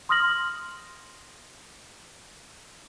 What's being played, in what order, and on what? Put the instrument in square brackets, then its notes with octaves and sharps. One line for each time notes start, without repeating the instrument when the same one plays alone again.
[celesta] C6 D#6 F6 A#6 F#7